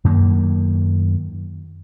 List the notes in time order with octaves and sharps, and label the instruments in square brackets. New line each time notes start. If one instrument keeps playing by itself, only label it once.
[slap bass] F#2 D#3 A#3